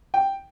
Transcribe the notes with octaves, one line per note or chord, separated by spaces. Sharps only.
G5